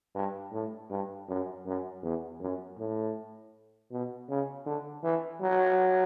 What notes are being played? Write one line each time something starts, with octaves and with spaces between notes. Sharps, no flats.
G2
A2
G2
F#2
F#2
E2
F#2
A2
B2
C#3
D3
E3
F#3